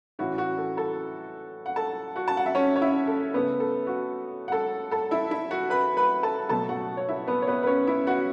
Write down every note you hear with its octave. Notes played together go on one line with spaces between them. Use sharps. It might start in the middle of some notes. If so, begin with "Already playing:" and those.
A2 E3 C#4 E4 F#4
F#4
A4
A4 A5
F#5
A4 A5
F#4 F#5
A5
F#5
E5
C#4 C#5
C#5
E4 E5
A4
C#3 A3 B3 E4 B4
A4
F#4
F#5
A4 A5
A4 A5
E4 E5
E4 E5
F#4 F#5
B4 B5
B4 B5
A4 A5
B2 F#3 A3 A4 A5
F#4 F#5
C#5
E4 E5
B3 B4
C#5
B3 B4
B4
C#4 C#5
E4 E5
F#4 F#5